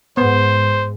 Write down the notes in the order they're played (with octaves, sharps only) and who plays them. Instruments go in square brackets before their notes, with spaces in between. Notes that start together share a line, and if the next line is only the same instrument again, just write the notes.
[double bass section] G#2 [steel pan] B3 [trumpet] C5